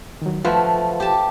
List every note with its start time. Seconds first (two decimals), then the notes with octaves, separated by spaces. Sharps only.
0.22 D#3 F#3
0.45 F3 A3 F4 B4 F#5
1.00 G4 A5